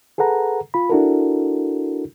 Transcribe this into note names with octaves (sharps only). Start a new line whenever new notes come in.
G#4 A4 B4 F#5 A#5
F4 B5
D4 E4 F#4 A4 A#4